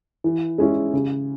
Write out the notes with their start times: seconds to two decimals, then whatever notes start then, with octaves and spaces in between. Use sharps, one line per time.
0.24 E3
0.58 G#3 C#4 E4
0.94 C#3